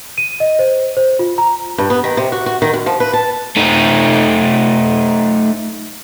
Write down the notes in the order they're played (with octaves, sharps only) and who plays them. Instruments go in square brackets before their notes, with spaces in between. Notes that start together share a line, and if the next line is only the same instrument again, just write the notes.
[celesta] D#7
D#5
C5
C5
F4
A#5
[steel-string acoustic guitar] G2
B3
D#3
C3
F#4
F#4
D#3
F#2
F3
B4
A5
[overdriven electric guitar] A3 D#4